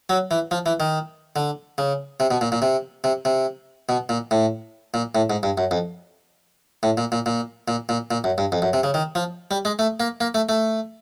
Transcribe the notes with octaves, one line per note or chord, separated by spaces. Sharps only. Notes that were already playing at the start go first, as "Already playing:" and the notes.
F#3
E3
F3
E3
D#3
D3
C#3
C3
B2
A#2
A#2
C3
C3
C3
B2
A#2
A2
A#2
A2
G#2
G2
F#2
F2
A2
A#2
A#2
A#2
A#2
A#2
A#2
F#2
G2
F2
F#2
C3
C#3
D#3
F3
G3
G#3
A3
A#3
A#3
A3
A3